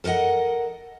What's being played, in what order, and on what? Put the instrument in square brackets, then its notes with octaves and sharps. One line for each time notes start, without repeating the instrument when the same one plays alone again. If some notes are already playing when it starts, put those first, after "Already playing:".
[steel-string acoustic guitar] A4 A#4 C#5 D#5 F#5